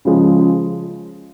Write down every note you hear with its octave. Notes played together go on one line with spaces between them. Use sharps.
C#3 F3 G#3